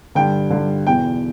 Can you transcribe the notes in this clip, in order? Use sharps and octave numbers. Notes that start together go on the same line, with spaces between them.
G2 D3 G5
G2 D3
E2 B2 G5